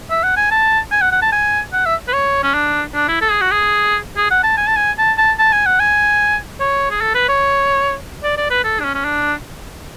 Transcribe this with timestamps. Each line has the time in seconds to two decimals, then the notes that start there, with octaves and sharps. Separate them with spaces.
0.10 E5
0.23 F#5
0.37 G#5
0.51 A5
0.91 G#5
1.01 F#5
1.12 F#5
1.22 A5
1.32 G#5
1.73 F#5
1.86 E5
2.08 B4
2.13 C#5
2.43 C#4
2.54 D4
2.94 D4
3.08 E4
3.22 A4
3.31 G#4
3.41 F#4
3.51 G#4
4.17 G#4
4.31 F#5
4.44 A5
4.57 G#5
4.67 A5
4.77 G#5
4.98 A5
5.18 A5
5.39 A5
5.53 G#5
5.66 F#5
5.80 G#5
6.60 C#5
6.91 G#4
7.01 A4
7.14 B4
7.29 C#5
8.23 D5
8.37 D5
8.50 B4
8.64 A4
8.80 D4
8.84 C#4
8.95 C#4
9.05 D4